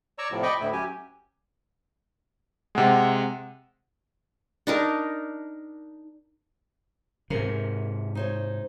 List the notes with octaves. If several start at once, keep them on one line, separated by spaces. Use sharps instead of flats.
C#5 D5 A#5 C#6 E6
A2 C3 F3
D5 D#5 G5 B5 C#6 D6
D2 A2 E4
F#3 C#4 G4 G#5
C3 G#3 F#5
D4 D#4 A#4
G#2 C3 A#4
D#4 C5 C#5